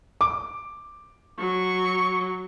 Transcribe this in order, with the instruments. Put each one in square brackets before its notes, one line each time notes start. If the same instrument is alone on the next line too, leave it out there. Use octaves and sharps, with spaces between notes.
[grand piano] D6
[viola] F#3 [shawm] C#6